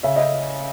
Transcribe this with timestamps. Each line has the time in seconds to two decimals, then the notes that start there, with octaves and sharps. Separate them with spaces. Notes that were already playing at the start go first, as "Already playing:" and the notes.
0.03 C#3 E5
0.16 D#5